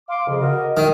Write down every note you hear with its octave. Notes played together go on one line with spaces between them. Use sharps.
F5 C6 D6
F2 C#3
F#4 A#4 D#5
D#3 D#6